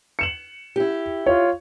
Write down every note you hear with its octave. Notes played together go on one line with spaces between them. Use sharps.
C#7 E7 F#7
E4 G4
F4 C#5